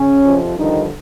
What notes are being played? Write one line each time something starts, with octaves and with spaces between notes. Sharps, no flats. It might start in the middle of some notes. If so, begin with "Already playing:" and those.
Already playing: C#3 C#4
F2 C3 F3
G2 D3 D#3 F3 D#4